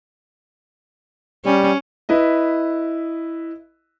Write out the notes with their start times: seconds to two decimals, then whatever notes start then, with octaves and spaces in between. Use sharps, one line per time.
1.45 G3 C#4
2.09 E4 B4 D#5